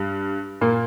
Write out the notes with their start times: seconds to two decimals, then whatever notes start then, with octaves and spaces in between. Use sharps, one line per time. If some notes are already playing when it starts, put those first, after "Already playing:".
Already playing: G2 G3
0.61 A#2 A#3